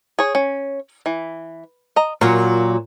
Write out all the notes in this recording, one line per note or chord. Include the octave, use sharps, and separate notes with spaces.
G#4 C#5
C#4
E3
D#5 A#5
A#2 F#3 F4 F#4 A#4